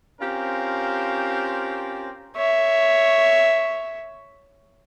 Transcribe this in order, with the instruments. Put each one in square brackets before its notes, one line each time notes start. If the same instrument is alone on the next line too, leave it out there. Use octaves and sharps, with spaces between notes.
[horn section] C4 C#4 F4 G4 A#4 C5
[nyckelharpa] C#5 E5